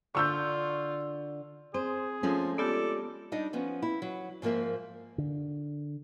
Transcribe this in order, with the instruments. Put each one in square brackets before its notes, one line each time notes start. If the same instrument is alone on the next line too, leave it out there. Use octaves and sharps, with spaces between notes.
[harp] D3 [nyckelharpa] F4 [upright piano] C#6 E6 G6
[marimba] C4 [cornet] G#4 [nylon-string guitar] C5
[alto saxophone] F3 [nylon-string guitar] G#3 A3 C#4
[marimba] B3 F4 G4 [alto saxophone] A4 [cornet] D5
[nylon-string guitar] G3 D4 D#4 D#5
F3 B3 C#4
E4
F#3
G#2 F3 A#3 A#4 E5
[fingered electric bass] D3